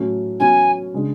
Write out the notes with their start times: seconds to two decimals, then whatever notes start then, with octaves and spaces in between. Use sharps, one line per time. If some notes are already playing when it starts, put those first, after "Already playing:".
Already playing: A2 F#3 A3 C#4
0.40 B2 F#3 C#4 G#5
0.94 C#3 G#3 D4